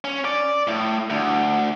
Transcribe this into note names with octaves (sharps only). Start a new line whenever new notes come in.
C#4
D5
A2
D2